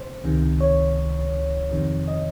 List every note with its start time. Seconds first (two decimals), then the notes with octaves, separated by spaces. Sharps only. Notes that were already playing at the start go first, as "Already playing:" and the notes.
Already playing: C3 C5
0.24 C#2 C3 D#3
0.60 C#5
1.71 F2 C3 D#3
2.08 D#5